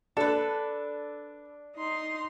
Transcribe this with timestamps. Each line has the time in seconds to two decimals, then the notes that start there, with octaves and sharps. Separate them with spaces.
0.17 D4 A4 B4
1.77 D#4 C6